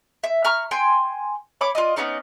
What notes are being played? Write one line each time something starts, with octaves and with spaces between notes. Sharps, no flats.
E5
A#5 C#6 F6
G5 G#5 C6
C#5 B5 D6
F4 D5 D#5
B3 C#4 D#4 D5